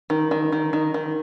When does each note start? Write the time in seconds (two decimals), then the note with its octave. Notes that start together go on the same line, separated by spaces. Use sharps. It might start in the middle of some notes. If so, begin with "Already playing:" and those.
0.10 D#3
0.31 D#3
0.52 D#3
0.73 D#3
0.94 D#3